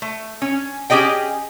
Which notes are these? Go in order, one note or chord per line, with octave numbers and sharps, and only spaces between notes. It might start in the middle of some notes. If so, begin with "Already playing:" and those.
A3
C#4
C#4 G4 G#4 D#5 G5